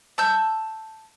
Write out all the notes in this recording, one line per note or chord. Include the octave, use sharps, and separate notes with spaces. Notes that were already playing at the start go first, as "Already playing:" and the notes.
A5 E6 G6